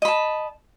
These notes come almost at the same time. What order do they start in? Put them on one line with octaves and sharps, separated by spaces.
D#5 B5 A5